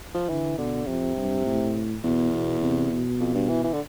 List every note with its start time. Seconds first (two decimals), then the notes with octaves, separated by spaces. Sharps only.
0.14 F3
0.29 D3 E3
0.58 B2 D3
0.87 F2 C3
1.16 G2
1.45 A2
2.04 E2 B2
2.33 B2
2.62 C3
2.91 B2
3.20 F2
3.35 G2
3.49 E3
3.64 E3
3.73 D3